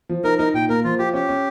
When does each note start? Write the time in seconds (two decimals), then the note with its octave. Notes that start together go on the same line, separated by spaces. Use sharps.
0.09 F3
0.24 D#4 A#4
0.38 D#4 A#4
0.54 A#2 G5
0.69 A#3 A#4
0.84 F3 F4
0.99 F4 G4
1.14 C#4 G4
1.29 C#4